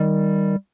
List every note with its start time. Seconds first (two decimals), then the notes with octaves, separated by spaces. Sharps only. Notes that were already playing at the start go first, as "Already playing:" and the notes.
Already playing: D#3 G3